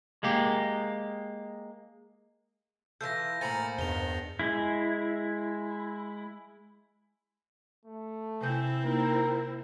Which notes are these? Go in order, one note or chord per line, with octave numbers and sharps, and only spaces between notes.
G#3 A#3 G4
E3 F4 A4 G6 A#6
A2 A#3 C5 G#5 A#5 B5 A6 C#7
E2 G2 D#3 F7 G7
G#3 E4
A3
C3 C4 E4 G#5 G6
A#3 D#4 F4 A#4